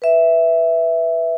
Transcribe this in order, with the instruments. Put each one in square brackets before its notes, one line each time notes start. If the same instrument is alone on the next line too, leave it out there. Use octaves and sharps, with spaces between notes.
[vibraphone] B4 E5